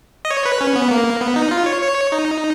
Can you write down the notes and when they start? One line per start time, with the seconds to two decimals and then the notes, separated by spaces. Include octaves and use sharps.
0.25 D#5
0.31 C#5
0.46 B4
0.61 C#4
0.76 B3
0.91 A#3
1.21 B3
1.36 D#4
1.51 F4
1.66 C#5
1.82 C#5
2.12 D#4